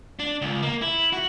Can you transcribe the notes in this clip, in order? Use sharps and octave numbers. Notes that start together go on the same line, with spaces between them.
D4
C#2
A#3
E4
F#4